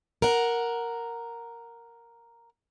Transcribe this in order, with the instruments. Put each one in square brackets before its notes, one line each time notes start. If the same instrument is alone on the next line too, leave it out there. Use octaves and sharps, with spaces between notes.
[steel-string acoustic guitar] A#4 F#5